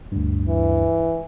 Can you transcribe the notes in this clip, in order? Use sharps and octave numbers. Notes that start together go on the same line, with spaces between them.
D2 G2
E3